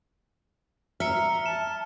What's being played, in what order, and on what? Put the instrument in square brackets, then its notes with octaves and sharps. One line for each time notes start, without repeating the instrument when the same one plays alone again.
[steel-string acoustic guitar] E5 [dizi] A#5 [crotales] F6 C#7
[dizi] A5 [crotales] E7